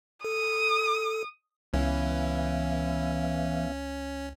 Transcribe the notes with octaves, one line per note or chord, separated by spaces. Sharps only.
A4 D#6
C#2 E3 B3 C#4 E5 F5